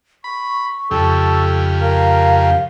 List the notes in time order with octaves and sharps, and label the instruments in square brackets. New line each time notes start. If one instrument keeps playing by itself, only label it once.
[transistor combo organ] B5 [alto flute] C#6
[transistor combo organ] F2 C#3 G4 [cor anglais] A4
[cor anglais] A#4 [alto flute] F5